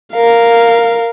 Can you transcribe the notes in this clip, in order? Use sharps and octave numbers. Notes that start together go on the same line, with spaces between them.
A#4 F5